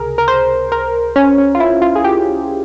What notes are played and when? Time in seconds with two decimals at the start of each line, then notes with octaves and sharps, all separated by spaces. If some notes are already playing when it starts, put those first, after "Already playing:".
Already playing: C#2 C3 G#4 A#4
0.18 A#4
0.28 C5
0.72 A#4
1.16 C#4
1.38 C#4
1.55 F4
1.60 E4
1.82 F4
1.95 G#4
2.04 G4